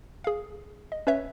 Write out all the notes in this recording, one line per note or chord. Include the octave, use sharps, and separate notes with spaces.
G#4 F5
D#5
C#4 B4 C#5 E5